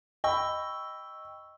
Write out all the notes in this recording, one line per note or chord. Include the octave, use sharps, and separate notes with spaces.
D#5 G5 B5 C#6 E6